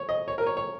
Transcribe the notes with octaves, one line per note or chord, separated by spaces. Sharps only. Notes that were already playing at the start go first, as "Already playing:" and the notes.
Already playing: C#5
D#5
C#5
A#4
C#5
C#5